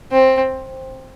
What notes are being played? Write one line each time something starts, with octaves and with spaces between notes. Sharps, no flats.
C4